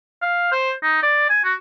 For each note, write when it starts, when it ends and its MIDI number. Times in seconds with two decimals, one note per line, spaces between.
0.22 0.47 77
0.52 0.73 72
0.83 0.99 63
1.03 1.25 74
1.30 1.41 80
1.44 1.54 66